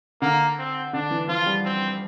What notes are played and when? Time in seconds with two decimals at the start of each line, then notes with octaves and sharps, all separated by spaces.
0.22 D3 A#3
0.58 C4
0.93 D3 D4
1.11 E3
1.28 F3 F4
1.46 G3
1.65 C4